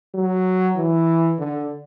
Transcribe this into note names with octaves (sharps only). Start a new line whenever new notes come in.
F#3
E3
D3